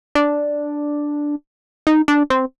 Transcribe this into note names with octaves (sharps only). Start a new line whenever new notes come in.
D4
D#4
D4
C4